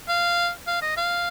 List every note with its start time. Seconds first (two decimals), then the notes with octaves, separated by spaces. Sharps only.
0.08 F5
0.67 F5
0.82 D#5
0.97 F5